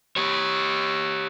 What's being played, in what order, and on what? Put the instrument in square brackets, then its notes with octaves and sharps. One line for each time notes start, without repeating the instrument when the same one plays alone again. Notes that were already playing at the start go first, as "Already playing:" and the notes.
[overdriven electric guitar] G4 C#5